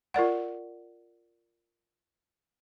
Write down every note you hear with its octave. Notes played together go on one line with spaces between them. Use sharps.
F4 A#4 D5 F#5